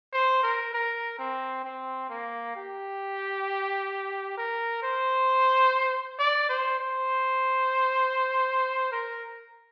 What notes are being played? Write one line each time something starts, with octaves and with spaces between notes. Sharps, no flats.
C5
A#4
A#4
C4
C4
A#3
G4
A#4
C5
D5
C5
C5
A#4